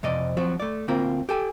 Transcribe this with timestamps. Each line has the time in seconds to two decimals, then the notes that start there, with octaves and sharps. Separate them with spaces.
0.03 F2 C3 D5 D#5
0.37 F3 F#3 C4 F#4
0.60 A3 D5
0.88 D2 A#3 C4 F4 A#4
1.29 G4 A4 G#5